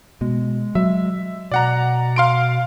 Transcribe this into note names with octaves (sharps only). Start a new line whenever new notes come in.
B2 G#3
F#3 E5
B2 D5 F#5 A#5
F5 C6 D7